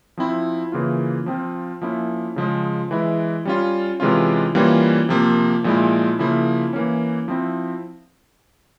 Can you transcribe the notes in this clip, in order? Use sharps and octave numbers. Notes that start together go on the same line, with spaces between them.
F3 C4 E4
C#3 E3 A#3 F4
F3 C4 F4
F3 A#3 C#4 E4
C#3 F3 G#3
E3 G#3 E4
G3 C#4 F4
C3 E3 G#3 C#4 F4
E3 G3 A#3 C#4 F4
C3 F3 A#3
A#2 F3 G#3 E4
C#3 F3 A#3 E4
E3 A#3 C#4
F3 C4 E4